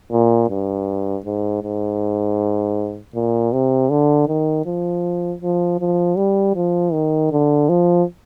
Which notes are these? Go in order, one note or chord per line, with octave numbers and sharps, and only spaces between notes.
A#2
G2
G#2
G#2
A#2
C3
D3
D#3
F3
F3
F3
G3
F3
D#3
D3
F3